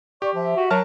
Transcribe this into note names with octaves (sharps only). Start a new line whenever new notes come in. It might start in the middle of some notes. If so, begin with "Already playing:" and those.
G4 D5 C#6
F3 E5
F#4
F#3 A#4 A5 F6